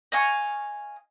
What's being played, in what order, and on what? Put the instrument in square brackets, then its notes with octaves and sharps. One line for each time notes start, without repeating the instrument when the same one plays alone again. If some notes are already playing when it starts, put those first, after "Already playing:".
[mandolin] D#5 F5 G#5 C#6